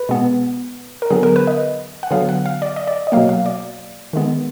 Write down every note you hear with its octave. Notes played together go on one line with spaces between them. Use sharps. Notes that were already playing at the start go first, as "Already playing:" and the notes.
Already playing: B4
B2 G#3 B3
A#4
D3 F#3 B3 G#4
A#4
B4
D#5
F#5
D3 F#3 B3 F5
F#5
F5
D5
D#5
D5
D#5
B2 F#3 A#3 F5
F5
D5
D#3 G#3 B3